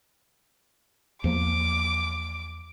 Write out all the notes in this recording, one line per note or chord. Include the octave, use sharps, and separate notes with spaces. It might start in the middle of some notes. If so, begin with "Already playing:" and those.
E2 F3 A#3 D6